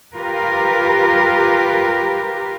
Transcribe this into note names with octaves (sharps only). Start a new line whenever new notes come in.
F4 G4 A#4 B4